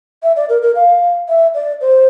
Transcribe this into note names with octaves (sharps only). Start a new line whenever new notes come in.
E5
D5
A#4
A#4
F5
E5
D5
C5